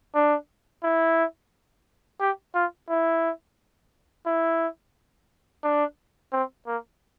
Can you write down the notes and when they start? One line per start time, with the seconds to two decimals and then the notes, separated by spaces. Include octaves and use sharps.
0.15 D4
0.83 E4
2.20 G4
2.55 F4
2.90 E4
4.26 E4
5.64 D4
6.33 C4
6.67 A#3